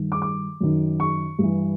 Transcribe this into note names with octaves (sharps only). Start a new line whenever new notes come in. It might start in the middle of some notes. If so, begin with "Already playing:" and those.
Already playing: G2 D#3
D6
D6
F#2 D#3
C#6
G2 E3